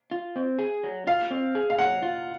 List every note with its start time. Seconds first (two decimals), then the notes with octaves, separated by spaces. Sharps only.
0.11 F4
0.36 C4
0.59 G#4
0.83 F#3
1.07 F4 F5
1.31 C4
1.55 G#4
1.70 F5
1.79 F#3 F#5
2.03 F4